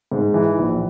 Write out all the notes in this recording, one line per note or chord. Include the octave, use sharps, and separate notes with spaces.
G#2
E3
A#1